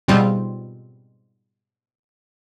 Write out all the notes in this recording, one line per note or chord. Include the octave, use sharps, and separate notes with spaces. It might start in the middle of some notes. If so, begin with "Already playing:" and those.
G#2 B2 G3 C4 F4